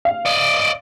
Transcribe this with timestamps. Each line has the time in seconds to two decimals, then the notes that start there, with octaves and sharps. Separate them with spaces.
0.05 F5
0.25 D5 D#5